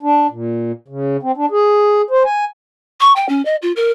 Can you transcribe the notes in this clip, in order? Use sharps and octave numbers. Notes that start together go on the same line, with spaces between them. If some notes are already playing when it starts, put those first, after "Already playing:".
D4
A#2
C#3
C4
D4
G#4
C5
G#5
C#6
G5
C#4
D#5
F4
A#4